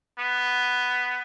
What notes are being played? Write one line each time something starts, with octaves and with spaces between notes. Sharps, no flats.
B3